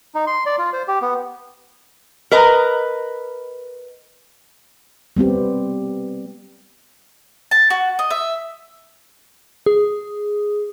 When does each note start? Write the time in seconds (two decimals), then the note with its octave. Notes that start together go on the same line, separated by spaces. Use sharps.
0.15 D#4
0.27 C6
0.46 D5
0.59 F4
0.73 C5
0.88 G4
1.02 B3
2.31 A#4 B4 D#5 A#5
5.16 G3 B3 C4 G4
7.51 A5
7.70 F#4
7.99 D#5
8.10 E5
9.66 G#4